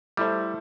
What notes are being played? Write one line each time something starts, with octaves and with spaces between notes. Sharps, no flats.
G3 A3 E4 A4 C5